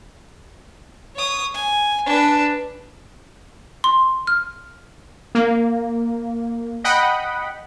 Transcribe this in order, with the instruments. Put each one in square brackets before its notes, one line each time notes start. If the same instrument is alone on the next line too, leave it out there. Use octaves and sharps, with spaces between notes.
[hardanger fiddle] C#5 D#6
G#5
D4 B4
[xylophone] C6
F6
[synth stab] A#3
D#5 F#5 G5 B5